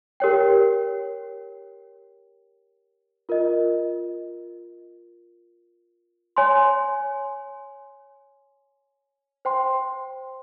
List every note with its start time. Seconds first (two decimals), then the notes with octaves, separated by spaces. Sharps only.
0.20 G4 A#4 C#5 G5
3.29 F4 A#4 D#5
6.36 C#5 G#5 C6
9.45 C5 G5 C6